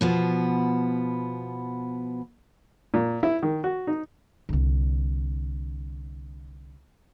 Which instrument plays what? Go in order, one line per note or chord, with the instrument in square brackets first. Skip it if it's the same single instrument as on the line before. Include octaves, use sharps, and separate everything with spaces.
[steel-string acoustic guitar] B2 F3 B3
[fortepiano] A#2
E4
D#3
F#4
D#4
[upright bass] C2 D3